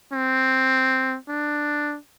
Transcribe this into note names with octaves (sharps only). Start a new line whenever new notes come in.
C4
D4